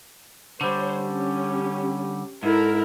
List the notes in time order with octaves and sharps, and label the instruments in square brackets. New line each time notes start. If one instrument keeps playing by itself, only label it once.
[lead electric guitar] D3 G3 [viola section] C5 C#5
[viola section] C#4 G4
[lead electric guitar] G#2 [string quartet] E4 [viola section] A4 A#4